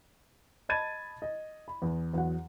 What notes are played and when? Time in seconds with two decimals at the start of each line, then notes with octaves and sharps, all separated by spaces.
0.69 D#5 A5 B5 G#6 A6 D#7
1.22 D#5
1.68 B5
1.82 E2
2.13 E2 F#3 F#5